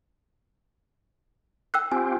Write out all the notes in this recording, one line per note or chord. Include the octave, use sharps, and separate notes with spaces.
G5 E6 F#6
C4 F4 G4 G#5